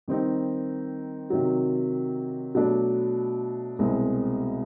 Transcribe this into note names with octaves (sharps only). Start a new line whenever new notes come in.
D#3 G3 C4 D#4
C3 D#3 F#3
B2 F#3 A3 D4
C2 B2 G#3 C4